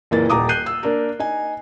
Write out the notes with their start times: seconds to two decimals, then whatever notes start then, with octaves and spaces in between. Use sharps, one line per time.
0.11 F#1 A#2 E3 A#3 A6
0.30 D#1 A#5 D6 D#6
0.49 F#6 G6 C7 D#7
0.66 E6
0.83 A#3 D4 A#4
1.19 D#4 G#5